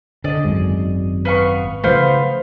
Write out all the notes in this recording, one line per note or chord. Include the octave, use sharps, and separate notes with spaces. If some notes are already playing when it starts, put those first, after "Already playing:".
D3 D5 D#5
G#1 F#2 G#3
B3 F5 C#6
C#3 F3 A3 B3 C5 F5